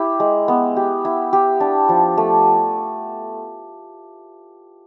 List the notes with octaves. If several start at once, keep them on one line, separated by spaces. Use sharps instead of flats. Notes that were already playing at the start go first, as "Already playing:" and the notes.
Already playing: E4 G4
G#3
B3
G4
E4
G4
D4
F3
A3